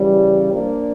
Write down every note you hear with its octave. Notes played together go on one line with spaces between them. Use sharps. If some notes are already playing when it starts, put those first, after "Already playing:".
Already playing: C#3 E3 G3
F3 A#3 D4